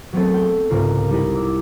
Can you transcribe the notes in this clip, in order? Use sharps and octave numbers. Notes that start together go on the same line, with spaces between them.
F#3 A3 B3 C4 G#4 A4
G5
C2 G#2 C#3 F4 A#4
G3 D#4 E4 G4
D6 E6